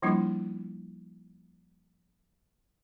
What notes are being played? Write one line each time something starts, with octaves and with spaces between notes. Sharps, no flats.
F3 G3 A#3 D4 E4 F4